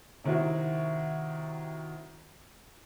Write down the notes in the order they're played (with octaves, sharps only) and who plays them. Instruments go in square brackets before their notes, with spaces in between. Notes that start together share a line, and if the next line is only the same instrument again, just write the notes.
[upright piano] C3 D#3 C4 E4 F#4